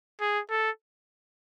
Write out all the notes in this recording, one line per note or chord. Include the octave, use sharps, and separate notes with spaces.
G#4
A4